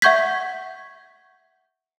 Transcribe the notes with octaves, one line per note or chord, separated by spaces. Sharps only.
E5 F#5 C#6 G6 G#6 B6